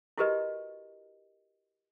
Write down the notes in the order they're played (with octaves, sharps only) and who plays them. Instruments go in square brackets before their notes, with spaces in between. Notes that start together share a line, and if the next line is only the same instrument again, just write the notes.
[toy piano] E4 F#4 G4 A#4 B4 D#5